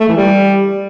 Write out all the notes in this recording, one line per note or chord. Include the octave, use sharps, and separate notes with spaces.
A3
E3
G3